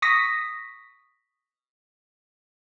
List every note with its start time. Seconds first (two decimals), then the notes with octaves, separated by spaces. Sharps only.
0.02 C#6 D#6 A#6 B6